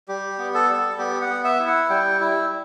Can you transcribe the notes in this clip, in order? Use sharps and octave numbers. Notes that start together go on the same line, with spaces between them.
G3 G4
B3
A4
G3
B3 G4
F#5
B3
E5
E4
F#5
G3 G5
E4